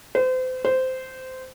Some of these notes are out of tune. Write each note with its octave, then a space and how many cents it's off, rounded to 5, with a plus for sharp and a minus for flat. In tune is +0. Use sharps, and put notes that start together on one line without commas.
C5 -35
C5 -15